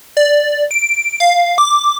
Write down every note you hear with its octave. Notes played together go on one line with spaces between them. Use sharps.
D5
D7
F5
D6